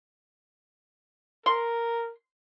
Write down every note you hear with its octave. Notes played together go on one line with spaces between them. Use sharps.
A#4 C6